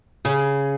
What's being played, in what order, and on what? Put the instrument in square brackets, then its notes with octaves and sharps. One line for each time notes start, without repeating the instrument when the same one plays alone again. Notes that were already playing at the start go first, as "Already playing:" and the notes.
[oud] C#3 [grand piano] G#4